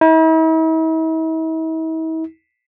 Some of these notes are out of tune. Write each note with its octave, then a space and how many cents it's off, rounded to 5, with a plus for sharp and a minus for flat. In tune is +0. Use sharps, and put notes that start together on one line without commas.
E4 -45